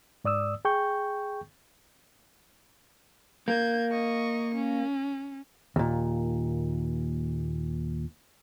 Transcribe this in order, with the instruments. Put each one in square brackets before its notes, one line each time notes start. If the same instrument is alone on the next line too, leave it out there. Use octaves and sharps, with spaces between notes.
[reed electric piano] G#2 D5 D#6 E6
G#4 G5 C#6 G6
[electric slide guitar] A#3 [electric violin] G6 G#6
[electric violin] D#5 C#6
C#4
[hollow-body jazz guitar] D#2 A#2